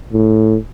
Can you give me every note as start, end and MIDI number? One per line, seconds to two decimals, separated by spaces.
0.13 0.58 45